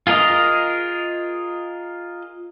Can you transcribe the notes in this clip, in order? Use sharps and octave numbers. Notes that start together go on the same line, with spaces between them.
F4 G#4 A#4 D#5 D#6